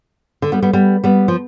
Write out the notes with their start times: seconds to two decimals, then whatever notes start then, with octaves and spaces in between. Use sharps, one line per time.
0.42 D3
0.52 G3 B3
0.62 G3 B3
0.73 G3 B3
1.04 G3 B3
1.28 F3